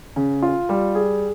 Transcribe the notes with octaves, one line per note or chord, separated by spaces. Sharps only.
C#3
F4
G3
G#4